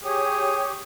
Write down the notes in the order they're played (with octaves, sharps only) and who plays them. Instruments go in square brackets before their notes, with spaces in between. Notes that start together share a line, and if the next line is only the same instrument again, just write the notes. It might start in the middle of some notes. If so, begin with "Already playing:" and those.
[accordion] G4 C#5 [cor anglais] G#4